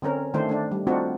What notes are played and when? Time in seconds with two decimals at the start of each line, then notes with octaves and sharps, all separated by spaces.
0.02 D3 C4 C#4 A#4
0.34 D#3 A3 D4 C5
0.49 A3 D4
0.72 G3
0.87 A3 C4 D4 D#4 F4 F#4